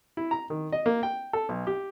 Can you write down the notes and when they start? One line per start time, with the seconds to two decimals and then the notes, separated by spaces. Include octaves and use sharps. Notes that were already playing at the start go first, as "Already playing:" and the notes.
0.17 E4
0.31 A#5
0.50 D#3
0.72 D#5
0.86 A#3
1.03 G5
1.33 A4
1.49 B1
1.67 G4